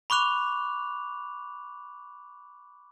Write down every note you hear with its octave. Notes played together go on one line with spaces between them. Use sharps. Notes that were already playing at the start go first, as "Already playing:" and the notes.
B5 C#6 D6 F#6 F7